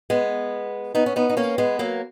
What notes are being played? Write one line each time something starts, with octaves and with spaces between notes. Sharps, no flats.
G#3 B3
B3 D#4
C#4
B3 D#4
D#4
A#3 C#4
G#3 B3
F#3 A#3